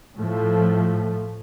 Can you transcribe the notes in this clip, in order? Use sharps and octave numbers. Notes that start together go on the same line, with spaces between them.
A2 F3 A3